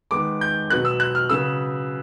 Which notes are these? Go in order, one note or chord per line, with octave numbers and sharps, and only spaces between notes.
D#3 G#3 B3 D6
G6
B2 F#3 B3 F#6
E6
F#6
F6
C#3 F#3 B3 E6